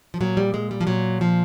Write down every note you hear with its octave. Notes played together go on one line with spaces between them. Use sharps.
F3
A#2 F#3
G3
G#3
G3
F3
A#2 F#3
F3